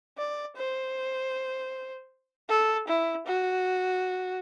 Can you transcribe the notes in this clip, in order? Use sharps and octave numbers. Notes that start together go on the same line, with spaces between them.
D5
C5
A4
E4
F#4